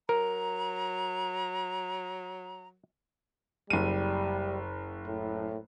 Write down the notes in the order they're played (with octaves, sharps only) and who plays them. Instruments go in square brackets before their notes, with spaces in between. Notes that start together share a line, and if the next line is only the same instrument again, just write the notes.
[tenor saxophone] F#3 [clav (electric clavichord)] A#4 [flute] A#5
[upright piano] F#1 D#7 [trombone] G3
[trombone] A2